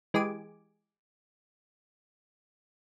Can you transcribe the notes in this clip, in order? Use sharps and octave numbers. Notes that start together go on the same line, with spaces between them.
E3 G#3 G4 G#4 G#5 D6